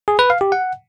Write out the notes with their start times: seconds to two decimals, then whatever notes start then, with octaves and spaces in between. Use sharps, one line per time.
0.08 G#4
0.19 B4
0.30 F5
0.41 G4
0.52 F#5